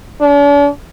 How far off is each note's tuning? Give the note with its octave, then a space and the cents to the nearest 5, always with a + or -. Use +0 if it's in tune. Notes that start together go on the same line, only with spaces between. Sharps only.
D4 -45